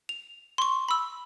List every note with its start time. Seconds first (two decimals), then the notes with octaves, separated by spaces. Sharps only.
0.09 F7
0.58 C6 C#6
0.89 B5 E6